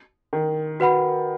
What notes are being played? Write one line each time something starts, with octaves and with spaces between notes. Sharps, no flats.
D#3
F#4 B4 F#5 B5